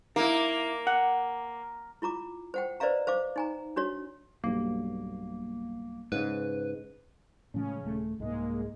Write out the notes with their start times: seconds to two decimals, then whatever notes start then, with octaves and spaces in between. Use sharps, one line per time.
0.16 A#3 D#4 E4
0.87 F#5
2.02 E4 F4 A#5 D6
2.54 C5 F#5 G5
2.80 B4 C5 D5 D#5 F5 A#5
3.07 C5 F5 D6
3.36 D#4 G#5 A#5
3.76 D4 F#4 C#5
4.44 B1 G2 A#3
6.12 G#2 C#3 B4
7.54 A2 C#3 F3 G#3 C#4
7.83 D#1 A3
8.20 C2 G#2 G#3 A#3